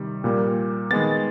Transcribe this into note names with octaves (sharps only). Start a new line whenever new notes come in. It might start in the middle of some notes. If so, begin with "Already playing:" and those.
Already playing: C3 D#3 G3
A#2 G3 A#3
D#3 G#3 B3 A6